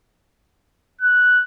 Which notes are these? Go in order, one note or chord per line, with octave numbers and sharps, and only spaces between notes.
F#6